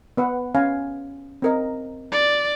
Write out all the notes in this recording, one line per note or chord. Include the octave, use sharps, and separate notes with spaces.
B3 B4 F#5
C#4 F5 G#5
C4 A#4 D#5
D5